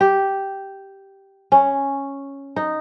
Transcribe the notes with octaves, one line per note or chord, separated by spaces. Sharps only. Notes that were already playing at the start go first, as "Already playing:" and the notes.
G4
C#4
D#4